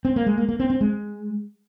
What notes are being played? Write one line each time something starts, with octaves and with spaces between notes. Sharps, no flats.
C4
A#3
G#3
A#3
A#3
C4
C4
G#3